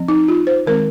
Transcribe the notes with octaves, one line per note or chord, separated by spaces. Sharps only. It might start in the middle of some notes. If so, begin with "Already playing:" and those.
Already playing: F3 C4
D#4
F4
C5
D#3 G#3 C4 A#4